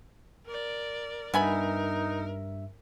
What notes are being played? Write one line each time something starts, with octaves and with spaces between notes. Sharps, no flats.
A#4 D5
G2 B3 D#4 A#4 E5 G#5 B5